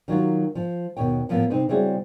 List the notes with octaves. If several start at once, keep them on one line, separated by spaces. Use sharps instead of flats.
D#3 F#3 F4 F#4
F3
D#2 B2 C#5 G5
A2 F3 A#3 B3
C3 C4 D#4 B4
C#3 G3 C4 E4 F#4 G#4